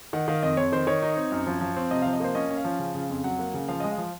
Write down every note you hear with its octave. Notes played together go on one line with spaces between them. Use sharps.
D#3 F#5
D#3 F5
F2 D#5
F2 C#5
D#3 C5
D#3 C#5
D#4
C4
F#2
F3
F3
C4
C3 D#5
F3 F5
D#5
A#3 C5
C#4 D#5
C#4
F5
F3
C#3
C#3
F2
F#3 F#5
A#3
C#3
F3 F5
G#3 D#5
F5
F3